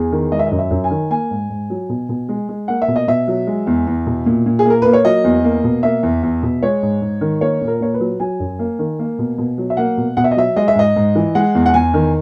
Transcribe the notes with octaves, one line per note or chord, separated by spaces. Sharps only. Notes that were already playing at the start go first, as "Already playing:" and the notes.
Already playing: E2 G#4
D#3
G#3 D#5
E5
D#5
F#2
E5
F#2
G#5
D#3
A#3 G#5
G#2
G#2
F#3
B2
B2
G#3
G#3
A#3 F#5
E5
B2
D#5
B2 E5
F#3
G#3
E2
E2
B2
A#2
A#2
G#4
A#3 A#4
A#3 B4
C#5
F#3 D#5
E2
A#3
B2
A#3 E5
E2
E2
B2
G#3 C#5
G#2
G#2
D#3
A#3 C#5
A#2
A#4
A#2 C#5
B4
F#3
F#3 G#5
F#2
A#3
D#3
A#3
B2
B2
F#3
E5
A#3 F#5
B2
B2 F#5
E5
D#5
F#3 E5
G#3 D#5
E5
G#2 D#5
G#2
E3
G#3 F#5
E2
F#5
E2 G#5
D#3